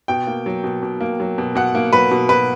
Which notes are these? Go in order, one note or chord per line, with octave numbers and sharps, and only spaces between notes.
B2 G5
A#3
F#3
B2
B2
A#3
F#3
B2
B2 F#5
A#3
F#3 B4
B2
B2 B4